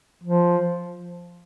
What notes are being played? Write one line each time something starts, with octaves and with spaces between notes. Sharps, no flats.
F3